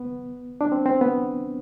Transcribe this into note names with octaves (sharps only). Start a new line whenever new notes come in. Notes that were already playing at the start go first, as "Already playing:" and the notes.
Already playing: B3
D4
C4
C4
B3